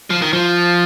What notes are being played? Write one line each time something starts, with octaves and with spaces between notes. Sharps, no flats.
F3
D#3
F3